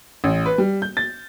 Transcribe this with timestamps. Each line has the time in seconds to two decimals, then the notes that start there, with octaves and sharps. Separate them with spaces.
0.24 A1
0.46 B4
0.58 G3
0.82 G6
0.97 A6